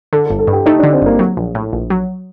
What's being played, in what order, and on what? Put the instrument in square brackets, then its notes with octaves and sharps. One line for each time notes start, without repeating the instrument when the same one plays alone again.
[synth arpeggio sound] D3 [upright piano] A4
[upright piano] A4
[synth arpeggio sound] G1
[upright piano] A4
[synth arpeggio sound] G2
[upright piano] G4
[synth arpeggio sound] A3 [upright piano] D#4
[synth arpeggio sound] D3 [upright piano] D4
[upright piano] C4
[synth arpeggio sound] G1 [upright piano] A#3
[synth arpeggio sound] F#3
A#1
A2
A#1
F#3